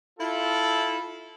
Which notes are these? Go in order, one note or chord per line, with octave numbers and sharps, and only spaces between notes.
E4 F4 A4